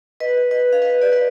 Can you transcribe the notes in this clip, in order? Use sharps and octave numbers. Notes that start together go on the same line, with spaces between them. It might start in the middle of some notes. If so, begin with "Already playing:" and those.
B4 D#5
B4 D#5
F5
B4 D#5
D5
B4 D#5